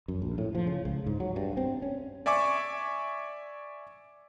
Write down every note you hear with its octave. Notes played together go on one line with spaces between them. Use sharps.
F#2
A#1
A2
F3
C#3
C#2
G#2
F#3
G2
C4
C#4
D5 E5 G#5 C#6 D6